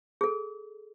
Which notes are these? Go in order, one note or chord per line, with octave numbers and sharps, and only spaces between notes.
G#4 A4